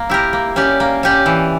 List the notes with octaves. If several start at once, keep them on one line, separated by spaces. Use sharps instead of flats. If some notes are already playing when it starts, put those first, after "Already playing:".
Already playing: A#3
E4 G4 A#4
A#3
C#4 G4 D5
A#3
C#4 G4 D5
E3